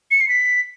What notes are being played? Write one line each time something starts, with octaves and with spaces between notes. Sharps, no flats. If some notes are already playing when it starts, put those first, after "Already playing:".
C#7
C7
B6